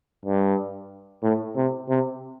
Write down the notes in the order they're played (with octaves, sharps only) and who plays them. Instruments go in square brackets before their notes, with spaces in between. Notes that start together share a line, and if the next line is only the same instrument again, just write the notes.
[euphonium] G2
A2
C3
C3